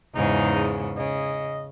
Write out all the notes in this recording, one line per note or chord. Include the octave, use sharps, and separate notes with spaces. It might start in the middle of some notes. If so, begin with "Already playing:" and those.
E2 G#2 C#3 D#4
C#3 D#5